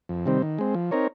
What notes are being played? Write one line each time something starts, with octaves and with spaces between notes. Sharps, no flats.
F2
C3 D#3 G3 C4
D#3
G#3 C4
F3
C4 D#4 A#4 C#5